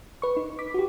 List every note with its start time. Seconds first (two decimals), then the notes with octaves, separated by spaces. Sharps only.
0.22 B4 C#6
0.37 D#4
0.59 D6 B6
0.74 F#4 G4